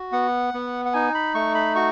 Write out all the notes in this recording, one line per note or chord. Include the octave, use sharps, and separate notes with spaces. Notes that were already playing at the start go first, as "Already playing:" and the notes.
Already playing: F#4
B3 F#5
B3
F#5
D#4 G#5
B5
A3 C#6
B5
F#4 C#6